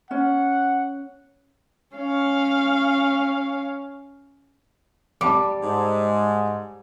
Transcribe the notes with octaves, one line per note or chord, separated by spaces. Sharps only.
C#4 F#5
C#4 F5
G3 A5 D6
G#2